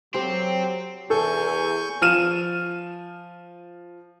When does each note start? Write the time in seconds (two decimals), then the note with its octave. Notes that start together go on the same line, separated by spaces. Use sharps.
0.14 F#3 C4 G4 C5
1.10 E2 A4 G#5 C#6 G6
2.02 F3 F6 D#7 E7